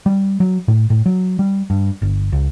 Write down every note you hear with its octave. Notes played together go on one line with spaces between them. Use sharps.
G3
F#3
A2
A2
F#3
G3
G2
G1
C#2